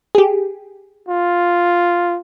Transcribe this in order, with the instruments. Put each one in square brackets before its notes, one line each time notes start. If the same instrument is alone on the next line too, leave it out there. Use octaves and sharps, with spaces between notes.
[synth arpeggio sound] G4 G#4
[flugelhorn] F4